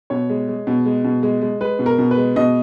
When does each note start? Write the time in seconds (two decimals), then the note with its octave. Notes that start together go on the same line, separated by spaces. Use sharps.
0.10 B2 C#5
0.29 G#3
0.48 G#3
0.67 B2
0.86 G#3
1.04 B2
1.23 G#3
1.42 G#3
1.60 G#3 B4
1.79 B2
1.86 A#4
1.98 B2
2.11 B4
2.17 G#3
2.36 B2 D#5